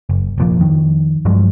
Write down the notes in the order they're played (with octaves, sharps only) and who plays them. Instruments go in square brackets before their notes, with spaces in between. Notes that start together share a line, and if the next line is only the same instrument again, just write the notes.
[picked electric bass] F#1
F1 A#2 F3
F2 D#3
G2 F3 F#3 G#3